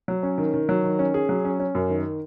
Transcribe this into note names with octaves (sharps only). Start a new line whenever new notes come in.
F#3
C#4
D#3
D#3
F#3
D#3
C#4
G#4
F#3
C#4
C#4
F#2
D#3